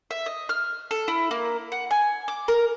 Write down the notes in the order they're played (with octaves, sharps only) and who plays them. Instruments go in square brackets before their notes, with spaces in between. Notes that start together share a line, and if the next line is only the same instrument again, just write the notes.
[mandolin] E5
D#5
F6
A4
E4
A#3
F#5
G#5
D6
A#4